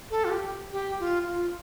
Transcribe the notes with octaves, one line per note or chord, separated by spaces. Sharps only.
A4
F4
G4
G4
F4
F4